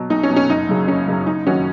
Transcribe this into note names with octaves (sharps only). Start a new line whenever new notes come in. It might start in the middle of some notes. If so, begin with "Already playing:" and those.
Already playing: B2 F#3
B1 D#4
C#4
B2 F#3
C#4
F#1 D#4
F#2 C#3 F#3
F#1 C#4
F#2 C#3 F#3
F#1 D#4
F#2 D#3 C#4 F#4